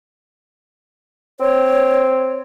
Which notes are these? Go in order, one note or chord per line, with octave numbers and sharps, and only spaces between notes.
C4 C#5